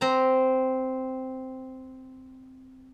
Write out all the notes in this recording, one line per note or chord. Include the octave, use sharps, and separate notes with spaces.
C4 A#5